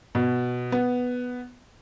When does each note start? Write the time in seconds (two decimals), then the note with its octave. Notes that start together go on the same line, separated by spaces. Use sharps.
0.15 B2
0.72 B3